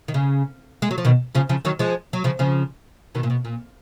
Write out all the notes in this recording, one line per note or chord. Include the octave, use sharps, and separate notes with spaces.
D#3
C#3
G#3
F#3
F3
B2 D#3
C#3 F3
C#3 F3
D#3 F#3
F3 G#3
F#3
C#3 F3
C#3 F3
B2 D#3
A#2
B2
A#2